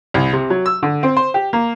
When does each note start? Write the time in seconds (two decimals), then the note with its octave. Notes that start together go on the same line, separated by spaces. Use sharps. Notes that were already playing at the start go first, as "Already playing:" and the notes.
0.14 C2
0.33 C3
0.50 F#3
0.66 E6
0.83 D3
1.03 C4
1.17 C5
1.34 G4
1.53 A#3